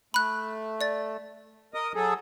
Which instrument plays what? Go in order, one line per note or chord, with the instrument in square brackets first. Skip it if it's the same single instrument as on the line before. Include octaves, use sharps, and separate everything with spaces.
[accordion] A3 [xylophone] B5 F#6
[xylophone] D5 A6
[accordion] A#4 D#5 D#6
F#3 G#4 A4